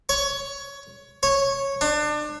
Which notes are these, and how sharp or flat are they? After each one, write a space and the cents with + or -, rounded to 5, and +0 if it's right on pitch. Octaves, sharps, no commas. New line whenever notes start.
C#5 +15
C#5 -10
D4 +30